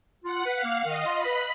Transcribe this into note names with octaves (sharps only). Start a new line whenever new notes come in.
F4 F#5
B4
F5
A#3
D#3 D#5
F4
B5
B4